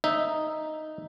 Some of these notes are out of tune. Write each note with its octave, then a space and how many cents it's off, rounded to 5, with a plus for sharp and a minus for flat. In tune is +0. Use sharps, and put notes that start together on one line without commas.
D#4 +0 E5 +0